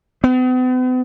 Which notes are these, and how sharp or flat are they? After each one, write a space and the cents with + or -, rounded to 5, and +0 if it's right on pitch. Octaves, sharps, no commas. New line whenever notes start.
B3 +45